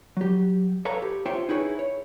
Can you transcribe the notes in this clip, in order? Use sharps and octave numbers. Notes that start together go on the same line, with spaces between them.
F#3 G4
A4 B4 C#5 F5 A#5
G4
F4 G4 C5 C#5 E5 G5
D#4 E4 G#4 B4 C#5
C#5